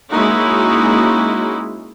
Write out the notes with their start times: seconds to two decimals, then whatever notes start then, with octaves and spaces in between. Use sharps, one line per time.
0.12 G#3 A#3 C#4 D#4 E4 F#4